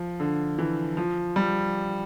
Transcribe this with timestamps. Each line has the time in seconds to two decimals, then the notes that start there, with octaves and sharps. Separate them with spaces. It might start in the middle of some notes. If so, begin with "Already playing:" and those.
Already playing: F3
0.20 D3
0.58 E3
0.97 F3
1.36 G3